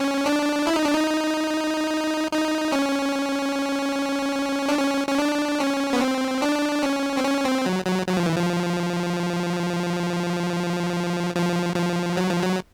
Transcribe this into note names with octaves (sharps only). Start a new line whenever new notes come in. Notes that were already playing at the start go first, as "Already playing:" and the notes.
Already playing: C#4
D4
E4
D#4
D4
D#4
D#4
C#4
D4
C#4
C#4
D4
C#4
B3
C4
D4
C#4
C4
C#4
C4
F#3
F#3
F#3
F3
E3
F3
F3
F3
F#3
F3
F#3